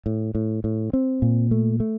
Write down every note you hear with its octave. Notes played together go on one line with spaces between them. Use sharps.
A2
A2
A2
C4
A#2
A3
A3